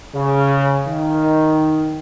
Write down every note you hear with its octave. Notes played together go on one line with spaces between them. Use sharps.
C#3
D#3